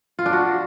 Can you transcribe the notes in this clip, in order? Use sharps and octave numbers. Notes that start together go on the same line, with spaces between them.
F4
D4
F#4